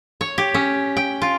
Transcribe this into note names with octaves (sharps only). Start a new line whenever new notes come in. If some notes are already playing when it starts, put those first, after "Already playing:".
C#5
G4
C#4
G5
F4